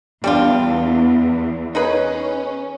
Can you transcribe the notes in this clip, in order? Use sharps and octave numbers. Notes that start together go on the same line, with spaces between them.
E2 G3 D4 F4
C#4 D#4 G#4 B4